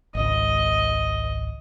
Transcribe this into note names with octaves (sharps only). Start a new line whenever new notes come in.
G#1 C#2 D#5